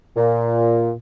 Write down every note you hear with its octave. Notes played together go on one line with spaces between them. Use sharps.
A#2